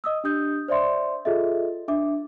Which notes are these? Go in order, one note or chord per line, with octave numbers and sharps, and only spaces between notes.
D#5 D#6 E6
D4 G4 D#6 G6
C5 D5 E5 C6
F4 G#4 A4 D#5 E5
D4 E5 D6